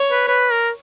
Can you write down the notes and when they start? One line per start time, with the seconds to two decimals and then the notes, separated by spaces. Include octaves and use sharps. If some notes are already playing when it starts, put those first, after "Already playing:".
Already playing: C#5
0.11 B4
0.28 B4
0.52 A#4